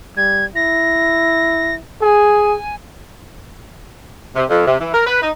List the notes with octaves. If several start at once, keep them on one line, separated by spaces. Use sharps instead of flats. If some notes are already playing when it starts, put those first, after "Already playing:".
G3 G#6
E4 A#6
G#4 G#5
C3
F2
C3
E3
A#4
B4
D#4